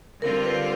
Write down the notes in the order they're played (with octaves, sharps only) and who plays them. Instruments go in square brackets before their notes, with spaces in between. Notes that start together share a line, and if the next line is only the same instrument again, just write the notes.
[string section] D3 G3 C4 F4 [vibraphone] A#4
[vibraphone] B4